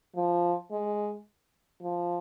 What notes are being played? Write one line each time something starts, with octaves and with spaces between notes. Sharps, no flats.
F3
G#3
F3